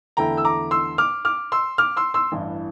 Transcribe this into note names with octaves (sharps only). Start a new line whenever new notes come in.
E2 D3 A3 E4 G5 A#5
E6
A#5 D6
C6 E6
D6 F6
D6 F6
C6 E6
D6 F6
C6 E6
C6 E6
A1 G2 E3